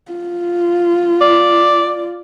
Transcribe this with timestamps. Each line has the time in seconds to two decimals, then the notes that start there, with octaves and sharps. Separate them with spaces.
0.12 F4
1.21 D5